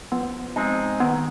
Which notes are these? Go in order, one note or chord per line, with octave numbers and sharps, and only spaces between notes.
F3 B3
G#3 C4 D#4 G#4
D#3 B3